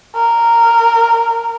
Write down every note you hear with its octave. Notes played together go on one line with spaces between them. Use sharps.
A#4